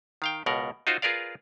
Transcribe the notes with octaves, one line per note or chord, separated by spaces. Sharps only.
D#3 F5 G5
C#2 B2 A#4 F#5
D#4 F4 F#4 C5
F4 G#4 A#4 B4 D5 F5